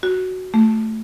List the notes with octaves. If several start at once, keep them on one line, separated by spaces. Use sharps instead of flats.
F#4
A3